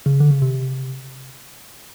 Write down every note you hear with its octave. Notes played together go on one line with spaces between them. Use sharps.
C#3
D3
C#3
C3